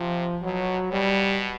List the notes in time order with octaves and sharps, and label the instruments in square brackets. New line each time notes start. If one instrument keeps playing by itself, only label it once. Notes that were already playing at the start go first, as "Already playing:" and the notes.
Already playing: [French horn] C3 [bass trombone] F3
[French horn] B2 [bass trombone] F#3
[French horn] B2 [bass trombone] G3